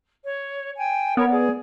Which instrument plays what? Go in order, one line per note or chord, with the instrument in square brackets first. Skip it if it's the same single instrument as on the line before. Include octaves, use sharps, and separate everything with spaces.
[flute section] C#5
G5 G#5
[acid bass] B3 [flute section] A#4 C#5
[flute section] G#4 D5